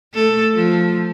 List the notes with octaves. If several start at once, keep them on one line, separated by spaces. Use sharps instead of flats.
A3 A4
F3